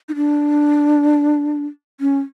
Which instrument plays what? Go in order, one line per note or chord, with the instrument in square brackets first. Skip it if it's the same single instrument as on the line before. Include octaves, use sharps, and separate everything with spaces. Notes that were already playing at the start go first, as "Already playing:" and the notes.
[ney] D#4
D4
C#4